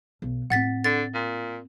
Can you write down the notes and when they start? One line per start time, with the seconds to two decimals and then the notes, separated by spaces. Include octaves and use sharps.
0.22 B1
0.50 A2 C4 F#5 A6 B6
0.84 D3 A6
1.14 A#2